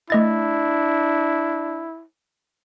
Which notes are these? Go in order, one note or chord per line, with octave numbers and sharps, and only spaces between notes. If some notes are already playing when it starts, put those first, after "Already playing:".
A3 D4 E4 D#5 A6